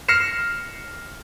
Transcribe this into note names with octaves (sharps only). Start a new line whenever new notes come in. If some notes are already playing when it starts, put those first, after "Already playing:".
F6 A#6 C7 C#7 E7